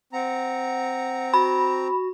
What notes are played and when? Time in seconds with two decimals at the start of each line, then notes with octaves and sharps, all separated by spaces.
0.13 C4 F#5 A#5
1.34 F#4 B5